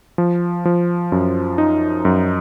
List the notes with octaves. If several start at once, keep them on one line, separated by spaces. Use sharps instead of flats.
F3
F3
F#2
D#4
F#2